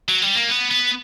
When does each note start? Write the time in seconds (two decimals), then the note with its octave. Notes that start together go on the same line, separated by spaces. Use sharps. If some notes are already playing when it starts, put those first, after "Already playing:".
0.09 F#3
0.22 G3
0.36 A#3
0.49 B3
0.71 B3